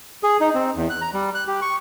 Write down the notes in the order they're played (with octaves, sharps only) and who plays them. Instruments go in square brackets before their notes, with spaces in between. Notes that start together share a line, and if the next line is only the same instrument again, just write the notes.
[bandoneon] G#4
D#4
C4
E2
F#6
A#5
G3
F#6
G4
C#6